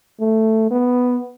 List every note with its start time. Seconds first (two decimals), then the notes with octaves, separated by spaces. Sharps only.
0.20 A3
0.71 B3